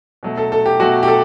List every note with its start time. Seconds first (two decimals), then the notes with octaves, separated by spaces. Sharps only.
0.23 B2 F#3 A3
0.38 A4
0.52 A4
0.66 G4
0.80 B2 F#3 A3 F#4
1.03 G4
1.08 A4